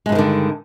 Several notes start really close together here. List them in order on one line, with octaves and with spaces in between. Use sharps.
G#3 G2 F3 D#3 D3